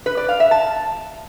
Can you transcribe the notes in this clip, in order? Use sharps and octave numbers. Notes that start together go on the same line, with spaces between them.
B4
D5
F5
E5
A5